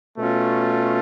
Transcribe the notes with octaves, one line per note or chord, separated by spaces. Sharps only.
B2 A3 C#4 F4